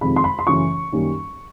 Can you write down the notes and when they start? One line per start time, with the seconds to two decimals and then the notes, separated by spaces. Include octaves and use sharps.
0.01 F2 C3 D#3 G#3 B5
0.16 C6
0.24 B5
0.39 C6
0.47 F#2 C#3 E3 A3 C#4 C#6
0.92 F#2 D#3 G3 A#3 C#4